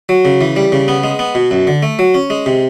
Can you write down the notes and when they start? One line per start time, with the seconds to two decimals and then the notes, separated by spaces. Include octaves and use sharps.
0.09 F#3
0.25 C#3
0.41 E3
0.56 G3
0.72 C#3
0.88 B3
1.04 G#3
1.19 B3
1.35 B2
1.51 F#2
1.67 D3
1.83 A3
1.99 F#3
2.15 C#4
2.30 G#3
2.46 C3